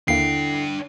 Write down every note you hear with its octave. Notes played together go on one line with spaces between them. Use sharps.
D#2 D3 A#3 D4 E4 G5 C7